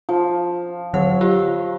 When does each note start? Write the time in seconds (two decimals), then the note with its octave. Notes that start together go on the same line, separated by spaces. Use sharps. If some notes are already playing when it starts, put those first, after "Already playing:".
0.09 F3
0.94 D3 F#3 C#5 F#5
1.21 F4 G4